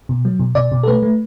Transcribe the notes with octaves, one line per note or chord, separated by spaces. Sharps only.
B2
F#3
B2
B2 D5
B2
A4
A3 B4
A3